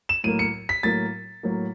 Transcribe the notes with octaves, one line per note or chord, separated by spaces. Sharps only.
E7
A2 F#3 A#3 D#7
C#7
B6
A2 F#3 A#3 A6
A2 F#3 A#3